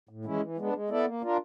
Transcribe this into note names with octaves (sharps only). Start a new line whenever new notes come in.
A2
E3 G#3 C#4 E4
E3
G#3 B3 D4
G#3
B3 E4 A4 D5
A#3
D4 F4 A#4